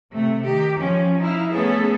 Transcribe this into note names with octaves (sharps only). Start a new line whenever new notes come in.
C3 A3
D#3 G4
F3 C#4
D#4 E4 F5
A3 B3 C#4 G#4 A4